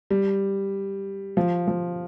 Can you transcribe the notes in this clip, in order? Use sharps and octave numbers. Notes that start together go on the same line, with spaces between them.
G3
F3
F3